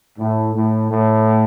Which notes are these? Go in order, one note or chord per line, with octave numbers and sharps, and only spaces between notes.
A2
A2
A2